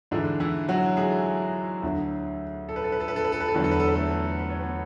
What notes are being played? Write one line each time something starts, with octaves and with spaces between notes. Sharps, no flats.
G#2 D3 E3 D4
E3 E4
F#3 F#4
G#3 G#4
D2 D3 F#3
A4
B4
A4
B4
A4
B4
A4
B4
A4
B4
A4
E2 D3 F#3 B4
A4
B4
A4
B4
A3 A4
B4
C#5
B3 B4